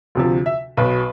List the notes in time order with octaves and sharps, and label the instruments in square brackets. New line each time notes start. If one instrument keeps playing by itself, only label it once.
[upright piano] D2 C3 F3
E5
B1 B2 B4